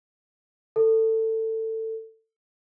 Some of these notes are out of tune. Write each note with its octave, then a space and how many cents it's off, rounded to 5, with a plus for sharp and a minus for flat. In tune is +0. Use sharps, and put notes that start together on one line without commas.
A4 +20